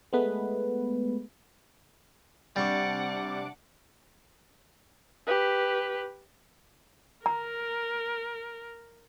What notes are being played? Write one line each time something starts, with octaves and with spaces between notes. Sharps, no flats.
G#3 A3 B3 B4
C3 G3 D4 F#5 C#6 D6
G4 B4
A#4 A#5